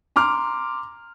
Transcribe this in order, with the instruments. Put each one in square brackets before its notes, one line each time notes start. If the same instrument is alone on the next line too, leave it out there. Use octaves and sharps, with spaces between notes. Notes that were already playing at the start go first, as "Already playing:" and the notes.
[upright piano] A#5 C6 D6 F6